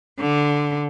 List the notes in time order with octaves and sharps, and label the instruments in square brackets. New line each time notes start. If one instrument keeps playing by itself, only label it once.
[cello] D3